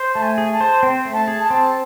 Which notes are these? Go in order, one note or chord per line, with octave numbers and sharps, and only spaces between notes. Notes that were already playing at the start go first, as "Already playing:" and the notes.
Already playing: C5
A3 A5
G#5
G#4
A5
C5
C4
A3
A5
G#4
A5
C4